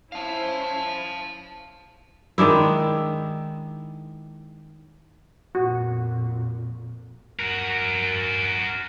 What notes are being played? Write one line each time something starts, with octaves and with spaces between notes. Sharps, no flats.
C#4 E4 C5 F5 A5
D#3 G#3 D4 E4
F2 A#2 F#4
F#4 A#4